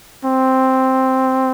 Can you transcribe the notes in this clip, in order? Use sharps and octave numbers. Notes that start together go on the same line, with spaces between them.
C4